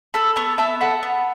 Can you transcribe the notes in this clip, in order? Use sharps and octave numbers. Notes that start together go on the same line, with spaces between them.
A4 B5 E6
B3 A5 C#6
B3 E5 A5
A4 F#5 B5
B3